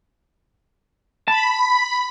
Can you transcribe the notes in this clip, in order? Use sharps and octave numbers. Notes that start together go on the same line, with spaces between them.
A5 B5